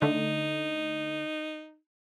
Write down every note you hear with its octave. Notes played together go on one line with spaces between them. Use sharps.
D3 A3 D#4